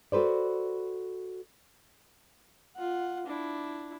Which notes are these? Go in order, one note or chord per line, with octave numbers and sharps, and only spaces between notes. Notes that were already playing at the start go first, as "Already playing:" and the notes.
F#4 A4 B4 C5 D5
F4 F#5
D4 E4